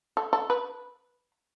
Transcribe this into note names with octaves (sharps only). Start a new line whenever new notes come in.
A4
A4
B4